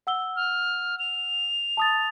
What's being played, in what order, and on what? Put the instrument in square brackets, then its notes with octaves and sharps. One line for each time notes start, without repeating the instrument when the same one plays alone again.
[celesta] F#5 E6 G7
[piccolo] F6
F7
[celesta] A5 D#6 A6